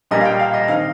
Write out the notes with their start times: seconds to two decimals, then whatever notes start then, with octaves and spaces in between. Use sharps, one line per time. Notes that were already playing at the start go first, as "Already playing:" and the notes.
0.11 A#2 G3 A#3 D#5
0.21 F5
0.25 G5
0.40 F5
0.53 D#5
0.68 D#3 C4 F5